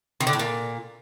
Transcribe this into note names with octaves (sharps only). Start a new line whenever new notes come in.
D#3
D3
A2
A#2